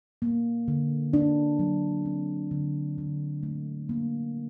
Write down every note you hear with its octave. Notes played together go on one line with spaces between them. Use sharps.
A#3
D3
D4
F#3
C4
D3
D3
A3
A#3